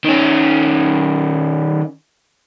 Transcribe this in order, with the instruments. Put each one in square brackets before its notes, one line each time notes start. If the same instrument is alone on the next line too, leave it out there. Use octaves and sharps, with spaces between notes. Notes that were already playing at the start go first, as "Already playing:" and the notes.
[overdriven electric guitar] D#3 C#4